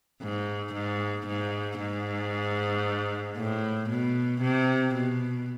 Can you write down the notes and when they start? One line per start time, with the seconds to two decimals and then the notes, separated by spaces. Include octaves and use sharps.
0.22 G#2
0.74 G#2
1.27 G#2
1.80 G#2
3.38 A2
3.90 B2
4.42 C3
4.95 B2